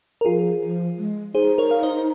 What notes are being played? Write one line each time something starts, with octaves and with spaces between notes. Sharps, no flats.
A#4
F3 F4 G#4
F3
G#3
D#4 G#4 C5
A#4 C#5
F5
C5 D#5